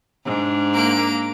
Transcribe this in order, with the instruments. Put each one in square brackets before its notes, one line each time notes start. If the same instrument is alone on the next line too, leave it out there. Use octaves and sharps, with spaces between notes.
[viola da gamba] G#2 D4
[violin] A#3 D7